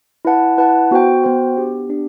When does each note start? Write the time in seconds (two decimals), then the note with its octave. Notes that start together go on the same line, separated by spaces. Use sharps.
0.25 E4 B4 F#5 A5
0.58 E4 B4 F#5 A5
0.91 B3 F#4 C5 G5
1.24 B3 F#4 C5 G5
1.56 B3 D4 G4
1.89 B3 D4 G4